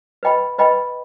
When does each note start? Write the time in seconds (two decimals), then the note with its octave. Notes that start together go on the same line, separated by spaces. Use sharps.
0.23 B4 D#5 G5 B5
0.58 B4 D#5 G5 B5